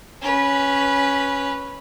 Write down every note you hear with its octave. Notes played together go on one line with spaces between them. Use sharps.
C#4 B4